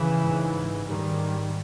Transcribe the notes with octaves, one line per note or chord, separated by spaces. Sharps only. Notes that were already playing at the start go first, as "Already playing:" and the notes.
Already playing: C#3 E3
G#2
G#2 D#3 G3